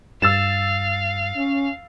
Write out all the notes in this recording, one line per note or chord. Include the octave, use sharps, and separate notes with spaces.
G2 F5 E6 A6 E7
C#4